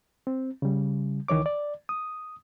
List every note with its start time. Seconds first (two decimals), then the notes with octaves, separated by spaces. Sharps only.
0.27 C4
0.62 C#3 G3
1.28 C#2 D#3 E3 C#5 D6
1.46 D5
1.89 D#6